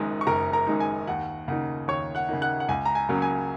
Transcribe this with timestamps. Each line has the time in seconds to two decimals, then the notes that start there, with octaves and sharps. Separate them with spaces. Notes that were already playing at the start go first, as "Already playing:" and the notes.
Already playing: F#1 F#2 D#3 G#3 D#4
0.21 C#6
0.27 F#1 A#4 A#5
0.53 A#4 A#5
0.67 F#2 D#3 G#3 D#4
0.80 G#5
1.07 D#2 F#5
1.48 C#3 A#3 D#4 F#5
1.88 D#2 C#5 C#6
2.15 F#5 F#6
2.29 C#3 A#3 D#4
2.42 F#5 F#6
2.60 F#5
2.68 C#2 G#5
2.85 A#5
2.95 G#5
3.09 C#3 F#3 A#3 C#4
3.22 G#5